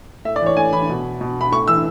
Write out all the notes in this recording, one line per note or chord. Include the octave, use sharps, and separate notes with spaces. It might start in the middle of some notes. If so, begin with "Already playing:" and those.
A2 E5
D5
E3 C#5
A2 G#5
E3 B5
B2
B2
B5
A2 C#6
E3 E6